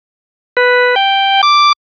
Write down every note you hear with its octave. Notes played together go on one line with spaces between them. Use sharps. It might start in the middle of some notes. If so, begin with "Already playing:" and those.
B4
G5
D6